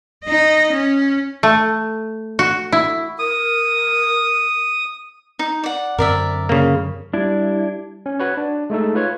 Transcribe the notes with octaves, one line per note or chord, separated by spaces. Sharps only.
D#4 D#5
C#4
A3
F#4
E4
A#4 D#6
D#4
D5 F#5
F#2 D3 C4 A#4 D5 E5
C#3 A#3
G3 D4 E4
C#4
F#4 B4 C#5
D4
G#3 A3 D#4 A4
F4 B4 C#5